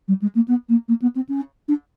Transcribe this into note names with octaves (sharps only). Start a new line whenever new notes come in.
G3
G#3
A#3
B3
A#3
A#3
B3
C4
C#4
D4